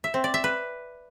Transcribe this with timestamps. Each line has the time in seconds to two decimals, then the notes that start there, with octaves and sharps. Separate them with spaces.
0.04 E5
0.14 C4
0.24 D5
0.34 E5
0.44 B4